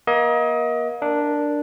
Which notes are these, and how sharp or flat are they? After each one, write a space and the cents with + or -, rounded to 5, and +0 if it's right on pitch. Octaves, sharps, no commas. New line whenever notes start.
A#3 +35 D#5 +30
D4 +0 A#4 +0